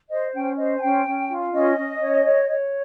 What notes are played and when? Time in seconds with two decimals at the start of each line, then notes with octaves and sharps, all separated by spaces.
0.09 C5 D#5
0.33 C#4 G5
0.57 C5 D#5
0.76 G#5
0.81 C#4 G5
1.06 C#4
1.29 F4
1.53 C#4 D#5
1.77 C#4
2.01 C#5
2.24 C#5
2.49 C#5